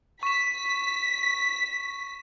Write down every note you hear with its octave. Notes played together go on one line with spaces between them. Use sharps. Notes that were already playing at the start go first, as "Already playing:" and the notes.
C#6 B6 E7